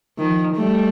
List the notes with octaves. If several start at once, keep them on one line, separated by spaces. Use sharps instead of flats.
D#3 F3
G3 A3